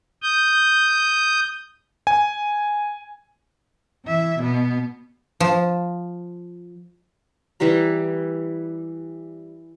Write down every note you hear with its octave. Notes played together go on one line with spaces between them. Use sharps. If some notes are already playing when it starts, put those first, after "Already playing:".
D#6 G6
G#5
E3 E5
B2 B3
F3
E3 G3 G4 A#5